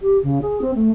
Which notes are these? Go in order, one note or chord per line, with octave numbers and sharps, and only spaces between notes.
G4
C#3
G#4
C4
A3